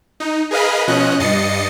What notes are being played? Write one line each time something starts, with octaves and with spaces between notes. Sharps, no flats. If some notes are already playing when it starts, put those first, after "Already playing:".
D#4
G#4 A#4 B4 D#5 F5 B5
B2 F3 C#4 D#5 F#6
G2 D#5 A6 C7 C#7